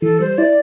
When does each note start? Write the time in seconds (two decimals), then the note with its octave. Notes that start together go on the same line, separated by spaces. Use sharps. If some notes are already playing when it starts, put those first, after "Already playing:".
0.02 E3 A4
0.20 G3 C5
0.38 E4 D5